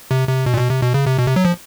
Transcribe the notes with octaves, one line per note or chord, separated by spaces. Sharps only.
C3
C3
B2
A#2
B2
C3
B2
C#3
C3
B2
C3
F#3
F3